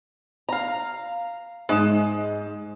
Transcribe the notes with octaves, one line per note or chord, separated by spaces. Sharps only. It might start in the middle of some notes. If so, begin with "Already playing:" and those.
F5 A#5
G#2 G#3 D#6 E7